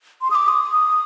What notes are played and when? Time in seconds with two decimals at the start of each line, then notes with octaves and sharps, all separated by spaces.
0.22 C6
0.30 D#6
0.35 D6
0.48 D#6